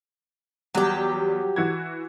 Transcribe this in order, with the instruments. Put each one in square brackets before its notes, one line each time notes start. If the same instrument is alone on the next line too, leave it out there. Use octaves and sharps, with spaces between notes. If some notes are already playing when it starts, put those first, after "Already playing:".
[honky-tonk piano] E2 G3 [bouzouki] F#3 G4
[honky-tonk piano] E3 F#4 G#6